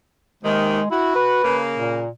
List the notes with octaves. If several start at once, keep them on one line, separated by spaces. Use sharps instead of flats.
D#2 C3 D#3 G#3
E4 F#4
B4
C#3 A#3
A#2